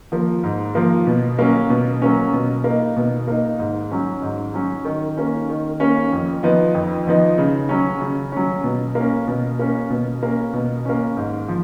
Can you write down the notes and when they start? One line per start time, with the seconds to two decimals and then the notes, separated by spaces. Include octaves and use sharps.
0.12 F3 A#3
0.44 G#2
0.75 F3 A#3
1.07 B2
1.39 F#3 A#3 C#4
1.70 B2
2.02 F#3 A#3 C#4
2.33 B2
2.64 A#3 D#4
2.97 B2
3.28 A#3 D#4
3.59 G#2
3.91 F#3 C#4
4.22 G#2
4.54 F#3 C#4
4.85 D#3
5.17 A#3 C#4
5.49 D#3
5.80 A#3 C#4
6.12 F2
6.43 F3 B3 D#4
6.74 F2
7.07 F3 B3 D#4
7.38 C#3
7.69 F#3 C#4
8.01 C#3
8.32 F#3 C#4
8.64 B2
8.95 A#3 C#4
9.27 B2
9.59 A#3 C#4
9.90 B2
10.23 A#3 C#4
10.53 B2
10.85 A#3 C#4
11.17 G#2
11.48 F3